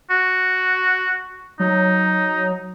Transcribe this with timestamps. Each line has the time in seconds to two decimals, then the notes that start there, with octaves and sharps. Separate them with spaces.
0.10 F#4
1.60 F#3 D#4